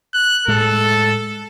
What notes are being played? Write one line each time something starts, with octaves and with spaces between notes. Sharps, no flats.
F#6
A2 G#3 A4